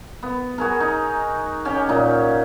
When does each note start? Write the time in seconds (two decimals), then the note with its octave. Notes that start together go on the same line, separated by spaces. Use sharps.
0.23 B3
0.58 F#4 G#4 A#4
0.80 D#4
1.65 C#4 F#4 G4
1.89 A#2 D#4